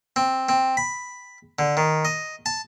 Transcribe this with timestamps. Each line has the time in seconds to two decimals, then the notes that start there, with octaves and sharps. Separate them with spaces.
0.16 C4
0.49 C4
0.77 B5
1.59 D3
1.77 D#3
2.05 D#5
2.46 A5